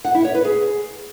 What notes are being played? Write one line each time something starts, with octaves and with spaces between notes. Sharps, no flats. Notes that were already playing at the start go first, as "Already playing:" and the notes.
F#5
E4
C#5
B4
G#4